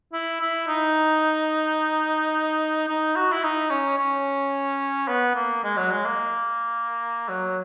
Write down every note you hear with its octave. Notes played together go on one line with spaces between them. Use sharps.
E4
E4
D#4
D#4
F#4
E4
D#4
C#4
C#4
B3
A#3
G#3
F#3
G#3
A#3
F#3